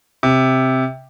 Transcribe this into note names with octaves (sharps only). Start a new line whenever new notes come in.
C3